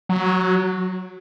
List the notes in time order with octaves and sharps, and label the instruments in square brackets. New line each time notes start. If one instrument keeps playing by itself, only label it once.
[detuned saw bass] F#3